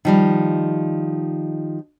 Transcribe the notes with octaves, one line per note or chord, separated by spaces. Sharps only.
D#3 F3 G3